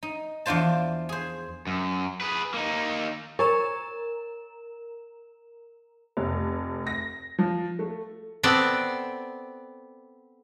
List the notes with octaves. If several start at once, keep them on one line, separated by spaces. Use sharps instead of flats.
D#4
E2 F3 D4 F4 C5 A5
G#4 C5
F#2
G#4 B4
A#3 D#4
A#4 C#5 A#5 E7
F1
A#6
F3
A3
B3 C4 A4 D5